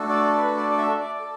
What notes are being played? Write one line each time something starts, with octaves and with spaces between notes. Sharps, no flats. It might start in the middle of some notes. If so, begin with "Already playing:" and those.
Already playing: A3 D4 F#4 A4
D5
B4
D5
D5
E5
D5
A4